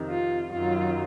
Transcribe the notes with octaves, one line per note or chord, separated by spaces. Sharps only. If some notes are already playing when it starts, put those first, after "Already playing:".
Already playing: F2 C3 D#3
F4
F#2 D#3 F#3 F4